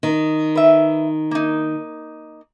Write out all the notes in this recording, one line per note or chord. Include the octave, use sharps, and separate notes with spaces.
D#3
B4 E5
A#3 D#4